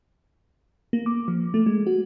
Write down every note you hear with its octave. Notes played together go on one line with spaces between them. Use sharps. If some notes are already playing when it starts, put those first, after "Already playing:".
A#3
D6
F3
A3
G#3
F#4